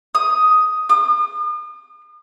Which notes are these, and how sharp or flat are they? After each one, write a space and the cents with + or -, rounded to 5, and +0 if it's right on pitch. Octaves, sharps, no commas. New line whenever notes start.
D#6 +5
D#6 -45